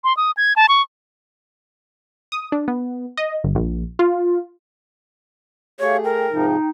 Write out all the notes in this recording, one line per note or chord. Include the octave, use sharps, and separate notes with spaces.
C6
D#6
G#6
A5
C#6
D#6
D4
B3
D#5
G1
A#1
F4
A3 G4 G#4 C#5 E5 F5
A#4 G5
G#2 C3 F3 D#4